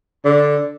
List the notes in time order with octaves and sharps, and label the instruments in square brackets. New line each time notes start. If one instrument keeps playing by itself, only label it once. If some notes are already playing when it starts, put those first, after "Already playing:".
[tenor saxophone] D3